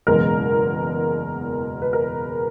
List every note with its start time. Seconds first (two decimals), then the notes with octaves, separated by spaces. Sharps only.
0.07 F#1 E2 B2 G#3 A#4
1.82 B4
1.93 A#4